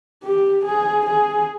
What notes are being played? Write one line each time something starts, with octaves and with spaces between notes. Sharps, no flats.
G4
G#4
G#4